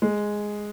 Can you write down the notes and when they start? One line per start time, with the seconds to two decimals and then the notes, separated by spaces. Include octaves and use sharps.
0.02 G#3